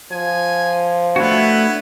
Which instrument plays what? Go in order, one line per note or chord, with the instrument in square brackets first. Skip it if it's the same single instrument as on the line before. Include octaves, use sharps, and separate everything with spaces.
[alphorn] F3 [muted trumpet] G#5
[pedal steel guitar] A3 D4 F#4 [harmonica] B3 E4 B4 [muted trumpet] C#5